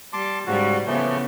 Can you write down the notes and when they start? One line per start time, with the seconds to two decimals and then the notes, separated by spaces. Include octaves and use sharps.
0.13 G3 A5 C6 D6
0.47 G#2 C#3 G3 F#4
0.86 C#3 E3 F3 A3 B3